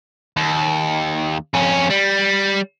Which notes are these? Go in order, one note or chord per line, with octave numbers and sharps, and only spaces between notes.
D#2
F2 C#4
G3